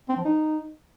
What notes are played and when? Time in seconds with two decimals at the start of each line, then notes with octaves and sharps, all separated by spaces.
0.09 C4
0.17 F3
0.25 D#4